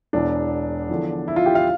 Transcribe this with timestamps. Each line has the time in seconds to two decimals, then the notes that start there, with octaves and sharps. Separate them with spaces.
0.13 E1 E2 E3 D4
0.89 E2 D3 F3
1.28 E4
1.36 F4
1.46 G4
1.55 F5